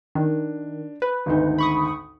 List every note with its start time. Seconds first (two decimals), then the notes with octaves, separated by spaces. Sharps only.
0.15 D#3 D4
1.02 B4
1.26 G#1 D2 D#4
1.58 B5 C#6 D#6